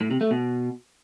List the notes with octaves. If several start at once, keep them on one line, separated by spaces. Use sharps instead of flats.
A2
C3
A3
B2